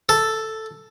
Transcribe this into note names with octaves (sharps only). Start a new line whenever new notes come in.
A4